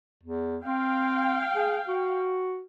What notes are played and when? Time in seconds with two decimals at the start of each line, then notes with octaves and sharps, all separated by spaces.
0.23 E2
0.64 C4 F5 G5
1.55 G#4
1.88 F#4